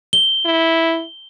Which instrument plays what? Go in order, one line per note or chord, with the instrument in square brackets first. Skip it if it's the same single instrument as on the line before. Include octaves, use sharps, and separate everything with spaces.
[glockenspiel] G7
[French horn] E4